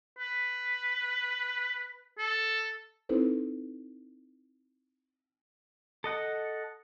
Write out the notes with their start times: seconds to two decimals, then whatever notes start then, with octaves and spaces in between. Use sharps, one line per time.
0.19 B4
2.18 A4
3.09 C4 D#4 E4 A4 B4 C5
6.04 A4 D#5 F#5